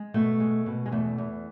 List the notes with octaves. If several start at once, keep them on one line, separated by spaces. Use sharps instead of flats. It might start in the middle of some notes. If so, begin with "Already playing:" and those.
Already playing: G#3
B2 A3
G#3
B2
G#3
E2 A3
E2